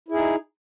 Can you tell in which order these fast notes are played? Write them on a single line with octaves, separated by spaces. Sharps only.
E4 G#4 D#4